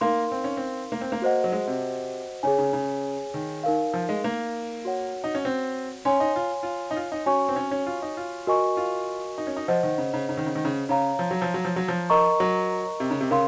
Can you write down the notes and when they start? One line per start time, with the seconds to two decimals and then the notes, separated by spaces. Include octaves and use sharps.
0.01 A#3 D#4 A#4 F5 C6
0.31 C4
0.44 C#4
0.57 C4
0.92 A#3
1.01 C4
1.12 A#3
1.22 F#4 C5 D#5 F#5
1.44 F#3
1.52 G#3
1.67 C3
2.43 C#3 G#4 C#5 G#5
2.58 C#3
2.73 C#3
3.34 D#3
3.63 D#4 A#4 F5
3.94 F3
4.09 G#3
4.24 A#3
4.85 F#4 C#5 F#5
5.24 D#4
5.35 C#4
5.45 C4
6.05 C#4 C#5 G#5 C6
6.20 D#4
6.36 F4
6.63 F4
6.91 D#4
6.96 F4
7.12 D#4
7.26 C#4 F#4 C#5 G#5 C#6
7.49 C4
7.56 C#4
7.71 C#4
7.87 F4
8.02 D#4
8.17 F4
8.47 F#4 A#4 D#5 G#5 C#6
8.77 F4
9.38 D#4
9.47 C#4
9.56 D#4
9.68 F3 C5 D#5 F#5
9.83 D#3
9.98 C#3
10.13 C#3
10.29 C#3
10.37 D#3
10.46 C#3
10.56 D#3
10.65 C#3
10.89 C#3 C#5 F5 A#5
11.19 F3
11.31 F#3
11.42 F3
11.54 F#3
11.65 F3
11.76 F#3
11.88 F3
12.10 A#4 D#5 A#5 C#6
12.40 F#3
13.00 C3
13.11 C#3
13.21 C3
13.31 C#3 A#4 F5 C6